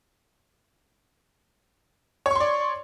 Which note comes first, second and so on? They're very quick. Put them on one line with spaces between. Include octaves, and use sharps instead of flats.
C#5 C#6 C6 D5